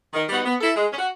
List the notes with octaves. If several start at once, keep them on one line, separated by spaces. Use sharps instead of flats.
D#3
G3 B3 D#4 F#4
B3
E4 A4
G#3
C#4
F#4